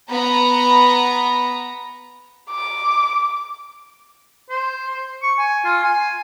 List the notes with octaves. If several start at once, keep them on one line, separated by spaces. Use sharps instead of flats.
B3 A#5
D6
C5
C#6
G#5
F4
G#5